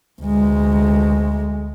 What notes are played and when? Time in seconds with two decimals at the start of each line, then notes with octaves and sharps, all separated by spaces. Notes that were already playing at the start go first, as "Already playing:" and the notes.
0.21 D2 G#3